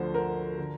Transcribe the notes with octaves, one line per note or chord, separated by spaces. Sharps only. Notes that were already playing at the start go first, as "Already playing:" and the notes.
Already playing: D2 D3 F3 C5
A#4
D3